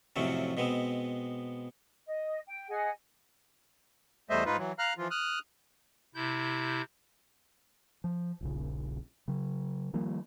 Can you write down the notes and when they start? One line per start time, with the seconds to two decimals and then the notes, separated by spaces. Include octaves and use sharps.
0.16 F2 A2 C3 F#3 C4 C#4
0.57 B2 G#3 B3 C4
2.06 D#5
2.47 G5
2.68 G#4 D#5 F#5 G#5
4.30 E2 G3 A3 C5 D#5 E5
4.46 G#2 D#4 F4 B4
4.58 E3 F#3
4.79 F5 A#5 F6 F#6
4.98 E3 F3 F4
5.11 D#6 F6 F#6
6.15 C3 E4 G6
8.04 F3
8.41 D#1 A#1 C#3
9.28 C#3 F#3
9.93 D#3 F3 G3 A#3